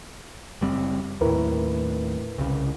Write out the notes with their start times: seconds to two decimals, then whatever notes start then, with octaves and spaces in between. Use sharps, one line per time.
0.61 F#1 G3 C4
1.21 D#2 A2 E4 A#4 B4
2.38 C2 C#3